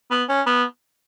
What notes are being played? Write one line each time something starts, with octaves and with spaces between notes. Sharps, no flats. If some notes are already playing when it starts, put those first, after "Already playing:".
B3
C#4
B3